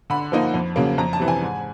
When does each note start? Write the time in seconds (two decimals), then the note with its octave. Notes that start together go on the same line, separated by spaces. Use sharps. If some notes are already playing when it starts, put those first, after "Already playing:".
0.10 D3 B5
0.32 F3 A#3 D#4
0.54 F2
0.76 C#3 F#3 A#3
0.98 F2 A#5
1.13 A5
1.20 C3 E3
1.28 G#5
1.41 G#2